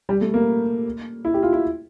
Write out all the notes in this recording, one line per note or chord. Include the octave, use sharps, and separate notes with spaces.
G3
A3
A#3
E4
G4
F4
E4